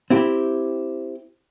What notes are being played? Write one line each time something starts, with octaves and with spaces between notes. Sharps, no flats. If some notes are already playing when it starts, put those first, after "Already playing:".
C4 E4 G4